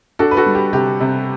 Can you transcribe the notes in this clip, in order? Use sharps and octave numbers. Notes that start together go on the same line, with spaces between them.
D4 F#4 A4
B4
F#4 A4
G3
G4
C3 G4
C3